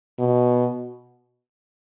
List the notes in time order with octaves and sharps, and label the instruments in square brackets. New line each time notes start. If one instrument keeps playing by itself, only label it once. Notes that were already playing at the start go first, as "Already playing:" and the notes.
[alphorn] B2